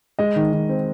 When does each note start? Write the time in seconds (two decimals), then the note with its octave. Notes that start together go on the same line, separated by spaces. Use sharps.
0.19 G#3 D#5
0.36 D#3
0.53 D#3
0.69 C4